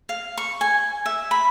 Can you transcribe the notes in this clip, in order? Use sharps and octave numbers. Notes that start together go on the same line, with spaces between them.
F5
C#6
G#5
E5
B5